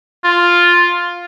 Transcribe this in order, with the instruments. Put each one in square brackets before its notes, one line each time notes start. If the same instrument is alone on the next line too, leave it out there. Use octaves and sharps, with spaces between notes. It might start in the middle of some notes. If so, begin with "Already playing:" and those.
[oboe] F4